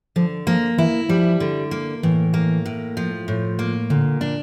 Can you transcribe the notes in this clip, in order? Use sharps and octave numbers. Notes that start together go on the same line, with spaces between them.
D3 F3
F3 A#3
E3 E4
F3 G3
D3
A#3
A2 E3
A#3
A2
F3
A2
A#3
A#2 D3
D4